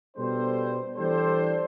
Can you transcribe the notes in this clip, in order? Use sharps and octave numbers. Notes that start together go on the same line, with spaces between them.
B2 G3 D4 A4 C5
E3 G3 D4 A4 C5